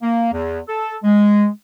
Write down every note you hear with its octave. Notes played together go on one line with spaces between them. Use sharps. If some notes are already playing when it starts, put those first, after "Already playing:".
A#3
E2
A4
G#3